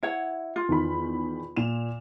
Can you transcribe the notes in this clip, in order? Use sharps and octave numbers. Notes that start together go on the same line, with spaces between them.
E4 C#5 F#5
F4
E2 D#3 B5
A#2 E7 F7